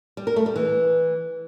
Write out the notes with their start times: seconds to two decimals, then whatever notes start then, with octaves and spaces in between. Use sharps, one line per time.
0.17 G3
0.27 A#4
0.36 A3
0.46 G3
0.56 E3